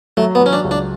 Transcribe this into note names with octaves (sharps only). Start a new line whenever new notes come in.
F#3 A3
B3
F#3 C#4
D4
C#2
D4